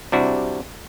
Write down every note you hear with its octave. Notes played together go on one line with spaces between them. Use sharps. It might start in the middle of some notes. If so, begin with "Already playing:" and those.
C3 G3 D4 E4 F#4